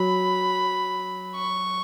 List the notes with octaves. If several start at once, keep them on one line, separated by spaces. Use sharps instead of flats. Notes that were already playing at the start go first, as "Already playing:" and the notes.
Already playing: F#3 B5
C#6